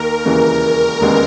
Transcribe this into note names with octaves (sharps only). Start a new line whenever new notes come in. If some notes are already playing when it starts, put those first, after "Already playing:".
Already playing: D#2 D#3 A#3 A#4
E1 D#2 C#3 E3 A#3
E1 D#2 C#3 G#3 B3